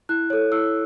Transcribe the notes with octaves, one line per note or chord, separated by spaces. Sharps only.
E4 F#6
A4 C#5
E4 E6